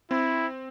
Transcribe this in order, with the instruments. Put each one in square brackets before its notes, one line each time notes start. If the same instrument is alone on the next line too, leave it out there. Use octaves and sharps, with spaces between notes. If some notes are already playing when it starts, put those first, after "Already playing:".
[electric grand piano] C4 [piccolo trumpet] E4